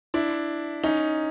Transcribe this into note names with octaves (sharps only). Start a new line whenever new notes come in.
D4 E4
C#4 D#4